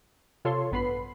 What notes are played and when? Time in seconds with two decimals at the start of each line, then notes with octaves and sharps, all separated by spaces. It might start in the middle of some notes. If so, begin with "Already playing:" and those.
0.45 C3 F4 A4 C#5 C6
0.71 A1 G2 B3 B4 B5 C7